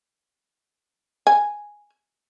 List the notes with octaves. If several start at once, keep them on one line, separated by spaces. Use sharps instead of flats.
G#5